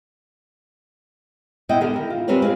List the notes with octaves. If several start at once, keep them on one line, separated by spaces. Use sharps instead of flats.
G#3 B3 E4 D#5 F#5 G5
D3 D#3 G#3 D#4 A4 A#4
E4 A#4
F4
G3 G#3 C4 A#4 B4 C#5
G#3 C4 F4 G#4